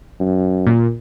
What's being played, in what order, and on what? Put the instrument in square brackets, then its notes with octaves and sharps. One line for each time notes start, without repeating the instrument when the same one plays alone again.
[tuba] F#2
[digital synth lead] A#2